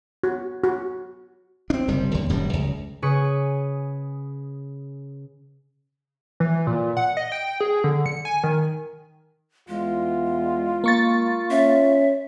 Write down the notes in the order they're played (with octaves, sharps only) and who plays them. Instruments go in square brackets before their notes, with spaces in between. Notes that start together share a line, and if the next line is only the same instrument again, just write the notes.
[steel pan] F#4
F#4
[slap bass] C4 D4
F#1 C3 G3
D#2 D3
D#1 F#2 A2 G3
C#2
[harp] C#3 G#4 B4 C#6 D#6 C#7
[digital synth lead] E3
A#2
F#5
D#5
G5
G#4
D3
C#7
G#5
D#3
[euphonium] E2 [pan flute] G#3 [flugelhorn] F4
[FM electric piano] A#3 C#6 A6
[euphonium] C#4 [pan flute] E5